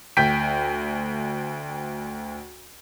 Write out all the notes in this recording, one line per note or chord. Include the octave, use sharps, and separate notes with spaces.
D2 G5 G6 B6 D7